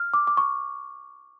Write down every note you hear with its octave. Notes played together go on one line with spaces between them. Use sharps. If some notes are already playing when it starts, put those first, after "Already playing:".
Already playing: F6
D6
D6
C#6